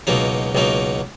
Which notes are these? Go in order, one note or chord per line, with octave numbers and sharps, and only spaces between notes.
C#2 B2 F#3 A#3 D#4
C#2 B2 F#3 A#3 D#4